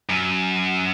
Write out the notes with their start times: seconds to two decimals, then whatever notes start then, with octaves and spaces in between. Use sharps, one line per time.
0.09 F#2